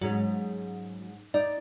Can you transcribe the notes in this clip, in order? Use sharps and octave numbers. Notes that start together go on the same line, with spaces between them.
G#2 F#3 C#4
D#4 D5